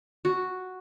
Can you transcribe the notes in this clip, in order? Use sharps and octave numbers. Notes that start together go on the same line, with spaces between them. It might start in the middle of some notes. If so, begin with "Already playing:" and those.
F#4